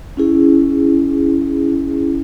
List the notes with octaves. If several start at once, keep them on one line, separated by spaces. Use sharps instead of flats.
C#4 E4 G#4